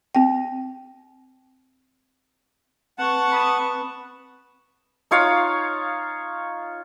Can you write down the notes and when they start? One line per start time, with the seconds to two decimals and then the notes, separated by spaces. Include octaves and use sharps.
0.15 C4 G5
2.98 C4 B4 F#5 A5 C#6
3.32 B5 D#6
5.11 D#4 F4 C#5 F5